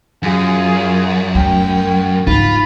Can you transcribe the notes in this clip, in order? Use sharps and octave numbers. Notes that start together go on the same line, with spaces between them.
F#2 F4 G#4
A3 G5
G#2 F4 B5